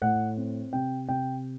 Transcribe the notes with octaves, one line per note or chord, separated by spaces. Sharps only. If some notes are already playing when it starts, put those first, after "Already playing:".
A2 F#5
C4
C3 G5
C3 G5